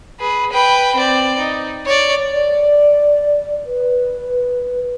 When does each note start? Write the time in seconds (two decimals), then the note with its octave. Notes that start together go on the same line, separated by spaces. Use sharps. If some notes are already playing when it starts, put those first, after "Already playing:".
0.20 G#4 B4
0.51 B4 G5
0.95 C4 D5
1.39 D#4
1.85 C#5 D5
2.32 D5
3.66 B4